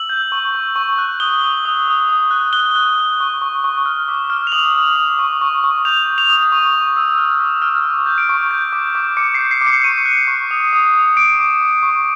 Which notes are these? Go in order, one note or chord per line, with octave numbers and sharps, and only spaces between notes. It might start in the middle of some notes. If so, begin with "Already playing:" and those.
Already playing: E6 F#7
G6
C#6
C#6
C#6
F#6
D#6 G7
D#6
D#6
D#6
D#6
F#6
F#6 G7
F#6
F#6
C#6
C#6
C#6
F6
D6
F6
F7
D#6 F#7
D#6
D#6
C#6
C#6
C#6
G6 F7
G6
F7
D#6
C#6
C#6
E6
F6
D6
F6
C#6
G6
D7
C#6
G6
D6
D6
D6 C#7
G6 C7
C7
D6
C#7
C#6 D#7
F#6
C#6
D#6
D#6
D#6
D6 D7
D6
D6
C#6